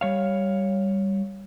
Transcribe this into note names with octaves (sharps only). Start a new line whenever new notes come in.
G3 C#5 F5